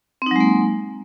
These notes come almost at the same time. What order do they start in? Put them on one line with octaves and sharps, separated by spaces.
C4 D#4 F#3 G#3 A#3